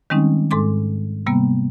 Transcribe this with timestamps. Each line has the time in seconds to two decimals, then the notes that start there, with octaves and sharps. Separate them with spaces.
0.10 D#3 G3 G#3 C4 C#4 D#4
0.51 G#2 G#3 A4 C6 D6
1.26 C3 G3 A#3 B3